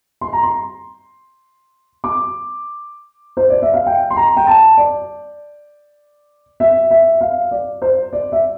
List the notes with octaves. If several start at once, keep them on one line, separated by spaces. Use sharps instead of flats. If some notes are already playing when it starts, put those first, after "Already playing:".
C6
A#5
C6
D6
C5
D5
E5
F5
G5
C6
A#5
G5
A5
D5
E5
E5
F5
D5
C5
D5
E5